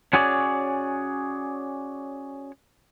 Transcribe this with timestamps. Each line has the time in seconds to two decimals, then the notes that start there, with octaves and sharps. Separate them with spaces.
0.13 C#4 F#4 G#4 C#5 D5